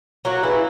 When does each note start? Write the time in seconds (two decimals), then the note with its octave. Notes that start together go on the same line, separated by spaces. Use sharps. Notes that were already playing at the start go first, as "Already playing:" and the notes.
0.25 F#3 A#3 F#4
0.43 C#3 E3 E4